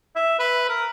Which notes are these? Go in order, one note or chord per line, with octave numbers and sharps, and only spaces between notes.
E5
B4
A#4